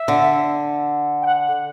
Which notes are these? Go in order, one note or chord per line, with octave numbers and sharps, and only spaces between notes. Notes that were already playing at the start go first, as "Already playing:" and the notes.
Already playing: E5
D3
G5
F#5
F#5